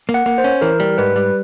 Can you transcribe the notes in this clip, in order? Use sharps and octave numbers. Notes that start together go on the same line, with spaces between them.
A#3
F#5
A#3
C5
C#4
E3 A#4
G3
G#2 B4
G3